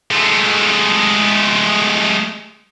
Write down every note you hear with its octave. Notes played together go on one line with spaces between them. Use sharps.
G#3 A3